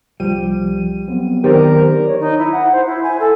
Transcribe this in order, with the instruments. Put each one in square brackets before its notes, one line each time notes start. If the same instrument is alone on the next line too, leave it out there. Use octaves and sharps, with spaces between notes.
[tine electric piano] C2 F3 [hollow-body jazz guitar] G3 [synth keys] D#7
[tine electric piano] F#3 B3 C4
[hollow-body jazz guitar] D#3 [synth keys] G4 C5 D5 [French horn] A#4
[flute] C#5
D#4
E4
F#5
C5
E4
G#5
A4